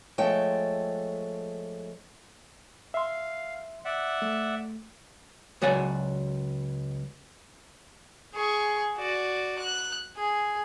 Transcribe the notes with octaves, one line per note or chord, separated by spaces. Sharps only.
F3 G#3 A3 C#5 G5
E5 F5 C6
D5 E5 F#5
A3
C#2 F#3 F#4 D5 F#5 G#5
G#4 C#6
F#4 D5
F#6
G#4